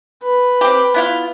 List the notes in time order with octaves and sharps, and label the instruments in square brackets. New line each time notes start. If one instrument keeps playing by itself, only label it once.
[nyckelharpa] B4
[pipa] C4 G4
B3 E4 F4